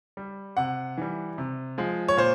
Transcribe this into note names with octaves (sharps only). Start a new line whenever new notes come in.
G3
C3 F#5
E3 G3
C3
F3 G#3
C#5
A#2 C5